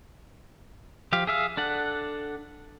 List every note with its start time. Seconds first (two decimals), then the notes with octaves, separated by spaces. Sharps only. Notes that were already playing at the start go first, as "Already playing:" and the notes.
1.13 F3 G4 F5
1.27 G#4 E5 F5
1.57 D4 A4 F#5